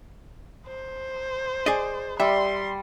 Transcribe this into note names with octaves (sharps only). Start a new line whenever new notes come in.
C5
G#4 D5 D#5
G3 E5 C6